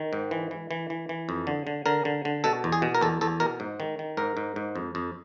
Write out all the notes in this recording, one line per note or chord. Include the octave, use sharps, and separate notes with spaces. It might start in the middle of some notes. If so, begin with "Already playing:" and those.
Already playing: D#3
G#2
E3
E3
E3
E3
E3
F2
D3
D3
D3 A#4
D3
D3
B2 A4
E2
G#4
B2
A#4
E2 A4
E2 A4
B2 A#4
G#2
D#3
D#3
G#2 A#4
G#2
G#2
F2
F2